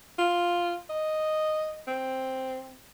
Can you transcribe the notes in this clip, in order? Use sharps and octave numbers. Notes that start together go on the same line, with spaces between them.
F4
D#5
C4